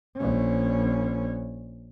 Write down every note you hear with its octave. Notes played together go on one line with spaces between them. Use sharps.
A#1 C#4